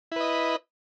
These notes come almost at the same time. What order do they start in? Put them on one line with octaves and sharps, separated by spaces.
E4 B4 D#5